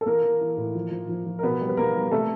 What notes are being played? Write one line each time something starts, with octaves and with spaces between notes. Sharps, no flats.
A4
E3 A#3 A#4
E3
E3
A2
F3
F3
F3
F3
A#4
B2 B3 B4
G3
B4
B2 A#3 A#4
G3
C3 A3 A4